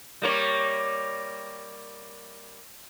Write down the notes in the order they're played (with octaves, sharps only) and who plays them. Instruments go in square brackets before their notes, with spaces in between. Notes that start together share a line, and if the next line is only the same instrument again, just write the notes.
[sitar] G3 A#3 C#5